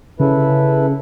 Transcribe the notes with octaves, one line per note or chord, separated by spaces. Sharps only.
C#3 E4 A4 B4